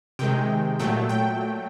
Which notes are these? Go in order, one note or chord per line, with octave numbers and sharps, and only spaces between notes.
C3 D#3 G#3 G5
A#2 F#3 A3 G5
G5